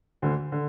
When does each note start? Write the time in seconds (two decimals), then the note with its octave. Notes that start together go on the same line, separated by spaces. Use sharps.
0.22 D2 D3
0.52 D3